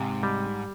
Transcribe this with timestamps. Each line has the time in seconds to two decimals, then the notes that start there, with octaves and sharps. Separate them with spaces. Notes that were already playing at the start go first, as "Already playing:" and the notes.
Already playing: G#2 C3
0.23 G3